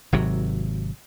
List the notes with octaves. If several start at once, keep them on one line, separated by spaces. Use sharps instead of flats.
G#1 C3 F#3